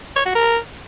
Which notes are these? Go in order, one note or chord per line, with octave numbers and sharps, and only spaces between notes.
C#5
F#4
A#4